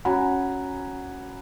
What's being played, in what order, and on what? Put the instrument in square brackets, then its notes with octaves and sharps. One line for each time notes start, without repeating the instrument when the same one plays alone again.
[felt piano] C#4 F#4 F#5 G#5 A#5 B5